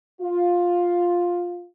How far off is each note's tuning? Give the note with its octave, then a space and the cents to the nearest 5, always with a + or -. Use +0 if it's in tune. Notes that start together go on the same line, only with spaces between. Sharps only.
F4 +10